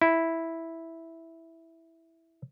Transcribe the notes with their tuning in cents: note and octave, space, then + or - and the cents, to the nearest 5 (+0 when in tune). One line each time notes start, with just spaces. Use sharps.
E4 -5